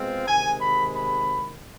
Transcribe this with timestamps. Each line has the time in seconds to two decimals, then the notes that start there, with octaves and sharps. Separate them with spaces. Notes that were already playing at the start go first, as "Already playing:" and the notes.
Already playing: B2 G#3 C4 F4
0.26 C3 D#3 G#3 G#5
0.60 B5
0.95 B5